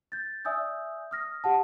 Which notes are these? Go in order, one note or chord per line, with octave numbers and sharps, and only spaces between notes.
G6 A6
D5 E5 G#5 D#6 E6 G6
D#6 F6 A#6
G4 F#5 A5